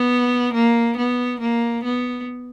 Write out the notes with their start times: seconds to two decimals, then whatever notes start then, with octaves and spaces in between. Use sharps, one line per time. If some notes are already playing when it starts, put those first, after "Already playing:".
Already playing: B3
0.54 A#3
0.97 B3
1.40 A#3
1.84 B3